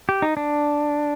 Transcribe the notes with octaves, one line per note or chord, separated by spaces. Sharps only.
G4
D#4
D4